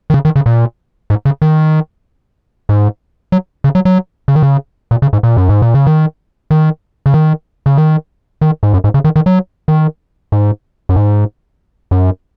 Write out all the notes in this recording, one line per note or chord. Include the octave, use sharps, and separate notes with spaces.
D#3
C#3
D#3
C#3
A#2
G#2
C#3
D#3
G#2
F#3
C#3
F#3
F#3
C#3
D#3
C#3
A#2
C#3
G#2
A#2
F#2
G#2
A#2
C#3
D#3
D#3
C#3
D#3
C#3
D#3
D#3
G#2
F#2
G#2
C#3
D#3
D#3
F#3
D#3
G#2
F#2
G#2
F#2